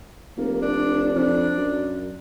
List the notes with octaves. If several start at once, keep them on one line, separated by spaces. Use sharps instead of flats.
F1 A#3
D4
F2 D4
F#2